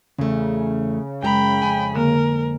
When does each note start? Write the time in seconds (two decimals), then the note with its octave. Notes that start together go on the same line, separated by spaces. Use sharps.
0.18 E2 C#3 A3
1.23 F#2 G#3 G4 G5 A#5 B5
1.62 F2 G#5
1.96 D3 A#3 A#4